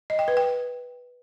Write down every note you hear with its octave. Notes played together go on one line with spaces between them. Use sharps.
D#5
G5
B4
G5